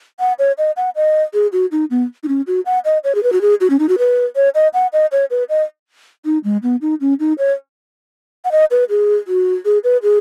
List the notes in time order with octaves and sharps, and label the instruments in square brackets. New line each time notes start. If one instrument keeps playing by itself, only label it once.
[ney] F#5
C#5
D#5
F#5
D#5
G#4
F#4
D#4
B3
D#4
C#4
F#4
F#5
D#5
C#5
G#4
B4
F#4
G#4
F#4
C#4
D#4
F#4
B4
C#5
D#5
F#5
D#5
C#5
B4
D#5
D#4
G#3
B3
D#4
C#4
D#4
C#5
F#5
D#5
B4
G#4
F#4
G#4
B4
G#4